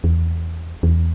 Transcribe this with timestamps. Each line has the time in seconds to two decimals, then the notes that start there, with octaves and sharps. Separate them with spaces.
0.04 E2
0.83 E2